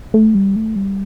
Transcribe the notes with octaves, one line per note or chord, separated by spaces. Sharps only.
A3
G3
A3
G3